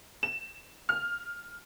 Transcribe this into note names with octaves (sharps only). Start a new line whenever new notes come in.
E7
F6